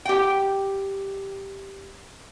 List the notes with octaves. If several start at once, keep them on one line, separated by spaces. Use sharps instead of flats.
G4 G5